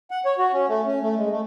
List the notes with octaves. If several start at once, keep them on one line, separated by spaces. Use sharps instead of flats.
F#5
C#5
F#4
C#4
A3
C#4
A3
G#3
A3